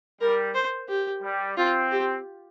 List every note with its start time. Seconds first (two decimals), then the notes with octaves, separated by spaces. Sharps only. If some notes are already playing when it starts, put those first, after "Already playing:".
0.20 G3 A#4
0.55 C5
0.89 G4
1.23 G3
1.57 C4 F4
1.91 G4